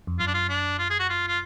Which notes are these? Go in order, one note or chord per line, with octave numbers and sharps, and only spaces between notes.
F2
F#2 F4
D4
F4
D4
F4
G#4
F#4
F4
F4